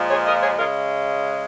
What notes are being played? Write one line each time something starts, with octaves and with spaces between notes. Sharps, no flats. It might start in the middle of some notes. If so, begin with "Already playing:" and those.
Already playing: A#2 F3 G#3
G#4 C#5
A#4 D#5
G#4 C#5
C#3 G#3 F4 A#4